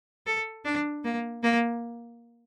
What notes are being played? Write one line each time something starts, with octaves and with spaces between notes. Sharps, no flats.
A4
D4
A#3
A#3